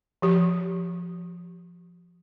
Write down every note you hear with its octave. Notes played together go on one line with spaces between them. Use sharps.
F3 G4